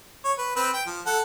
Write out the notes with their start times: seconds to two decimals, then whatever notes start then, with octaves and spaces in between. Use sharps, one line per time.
0.25 C#5
0.38 B4
0.56 C4 B4
0.74 G5
0.86 F3
1.06 A4 F#5